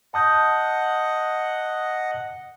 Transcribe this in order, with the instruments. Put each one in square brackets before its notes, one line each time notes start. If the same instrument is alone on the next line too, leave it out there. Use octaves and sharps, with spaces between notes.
[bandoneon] D#5 F#5 [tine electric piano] A5 D#6 G6